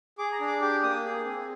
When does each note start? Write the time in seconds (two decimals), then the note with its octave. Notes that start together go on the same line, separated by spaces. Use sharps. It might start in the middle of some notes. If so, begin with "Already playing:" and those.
0.18 G#4 D6
0.32 A#5
0.40 D4
0.48 D6
0.61 G4 D6
0.83 A#3 D#6
1.04 G#4
1.24 C4